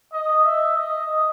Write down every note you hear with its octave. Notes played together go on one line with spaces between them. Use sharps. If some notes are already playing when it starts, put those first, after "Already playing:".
D#5
E5
D#5